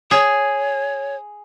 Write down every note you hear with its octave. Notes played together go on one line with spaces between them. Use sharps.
G#4 C#5